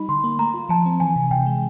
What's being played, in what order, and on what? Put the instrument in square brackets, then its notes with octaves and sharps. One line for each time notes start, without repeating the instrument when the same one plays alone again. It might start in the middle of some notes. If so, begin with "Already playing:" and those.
Already playing: [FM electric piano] G3 D#4 [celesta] B5
[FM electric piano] D3 [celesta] C6
[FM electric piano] A#3
[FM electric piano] A3 [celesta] A#5
[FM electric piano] F4
[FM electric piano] F3 [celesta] A5
[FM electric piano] C4
[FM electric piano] E3 [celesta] G#5
[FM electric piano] C3
[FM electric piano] C3 [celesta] G5
[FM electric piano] G#3